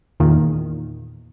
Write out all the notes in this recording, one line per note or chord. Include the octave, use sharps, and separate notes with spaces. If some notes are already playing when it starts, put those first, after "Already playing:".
E2 A#2 D#3